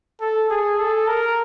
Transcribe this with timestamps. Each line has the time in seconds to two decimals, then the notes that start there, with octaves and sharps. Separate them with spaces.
0.20 A4
0.50 G#4
0.79 A4
1.08 A#4